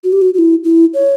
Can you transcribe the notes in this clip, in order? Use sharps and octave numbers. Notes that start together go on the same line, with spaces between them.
F#4
G4
F#4
F#4
E4
E4
C#5